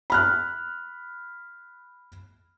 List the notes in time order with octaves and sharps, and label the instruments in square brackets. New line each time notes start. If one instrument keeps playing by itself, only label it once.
[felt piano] B5 F6 F#6